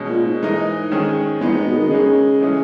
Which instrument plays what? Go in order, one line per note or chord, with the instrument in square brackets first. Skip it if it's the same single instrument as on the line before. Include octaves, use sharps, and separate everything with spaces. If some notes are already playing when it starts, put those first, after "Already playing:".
Already playing: [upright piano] B2 G#3 C#4
[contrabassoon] A#2
G#2
[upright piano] E3 G#3 D#4 A#4 D#5
D#3 G#3 C#4 G#4
[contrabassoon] E2 [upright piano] G#3 B3 D#4
[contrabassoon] G#2
B2
D#3
[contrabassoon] C#3 [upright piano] G#3 D#4 G#4
[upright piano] E3 G#3 C#4 G#4